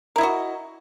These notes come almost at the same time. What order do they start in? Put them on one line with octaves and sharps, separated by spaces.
A#4 E4 D#5 F#4